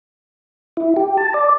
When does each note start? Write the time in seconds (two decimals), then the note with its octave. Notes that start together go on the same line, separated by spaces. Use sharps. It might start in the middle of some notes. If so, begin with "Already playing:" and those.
0.77 E4
0.96 G4
1.17 A5
1.34 D5